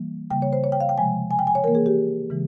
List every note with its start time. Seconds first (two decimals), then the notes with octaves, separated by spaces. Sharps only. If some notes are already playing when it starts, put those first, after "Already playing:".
Already playing: E3 G3 A#3
0.31 C#3 G3 A#3 G5
0.42 C#5
0.53 C5
0.64 C#5
0.72 G5
0.81 F5
0.89 G5
0.98 C3 F3 G#3 G#5
1.31 G#5
1.39 G5
1.47 G#5
1.55 C#5
1.64 E3 A#3 A#4
1.75 G#4
1.86 G4
2.30 C#3 E3 G#3